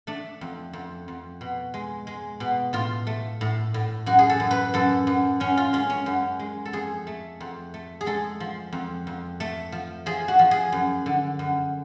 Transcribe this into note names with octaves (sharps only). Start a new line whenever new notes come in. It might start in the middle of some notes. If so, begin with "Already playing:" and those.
A3 D4
F2
F2
F2
B2
G#3
G#3
B2
A2 F4
A3
A2
A2
F#2 F#4
G#4
A4
F#2
B4
F#2 A4
F#2
F#2 C#4
F4
G#3 C#4
C#4
F#2
G#3
A4
F2 G#4
A3
F2
A3
G#4
G#3 A4
F3
F2
F2
A3
F3
F3 G#4
F#4
F3
G#4
F#2
D3
F#2